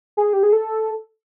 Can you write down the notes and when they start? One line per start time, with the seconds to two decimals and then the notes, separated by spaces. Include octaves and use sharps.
0.17 G#4
0.33 G4
0.43 G#4
0.53 A4